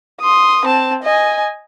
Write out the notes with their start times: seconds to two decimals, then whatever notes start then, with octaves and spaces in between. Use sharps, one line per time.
0.21 C6 D#6
0.65 C4 A5
1.03 D#5 G#5